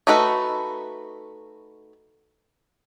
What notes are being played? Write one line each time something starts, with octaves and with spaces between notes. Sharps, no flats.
A3 D#4 F#4 A4 B4